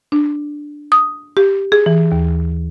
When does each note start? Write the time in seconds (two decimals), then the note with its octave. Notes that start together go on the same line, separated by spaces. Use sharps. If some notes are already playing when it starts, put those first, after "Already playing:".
0.12 D4
0.92 D#6
1.37 G4
1.72 G#4
1.86 E3
2.12 D#2